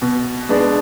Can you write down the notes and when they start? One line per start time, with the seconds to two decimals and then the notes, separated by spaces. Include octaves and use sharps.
0.02 B2
0.49 G#3 B3 D4